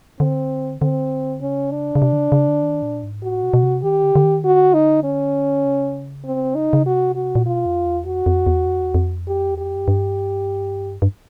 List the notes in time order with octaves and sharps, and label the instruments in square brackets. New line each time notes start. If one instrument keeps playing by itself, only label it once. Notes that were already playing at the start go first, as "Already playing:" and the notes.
[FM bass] D3 [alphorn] C4
[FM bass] D3 [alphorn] C4
[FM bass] C#3 [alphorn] C#4
[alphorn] D4
[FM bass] C#3
C3
D3
C#3
C#3
D3
D#3
A#2
G#2
[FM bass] A2 [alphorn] F#4
[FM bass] B2
B2
C3
[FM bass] D#3 [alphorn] G4
[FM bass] D3
D3
D#3
[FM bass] D3 [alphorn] F#4
[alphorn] D#4
C#4
[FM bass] C#3
[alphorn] C4
D#4
[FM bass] C#3
[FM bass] C3 [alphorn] F#4
[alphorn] F#4
[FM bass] A#2
[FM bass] B2 [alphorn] F4
[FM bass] F2
E2
[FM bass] F2 [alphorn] F#4
[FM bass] F2
E2
F2
E2
F2
[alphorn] G4
[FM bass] E2
[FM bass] F2 [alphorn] G4
[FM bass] F#2
G2
G2